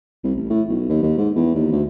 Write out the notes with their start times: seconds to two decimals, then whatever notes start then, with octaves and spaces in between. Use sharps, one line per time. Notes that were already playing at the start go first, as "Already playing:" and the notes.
0.24 C2
0.36 A1
0.50 A2
0.69 B1
0.90 D#2
1.03 D#2
1.18 G#2
1.36 E2
1.55 D#2
1.72 D2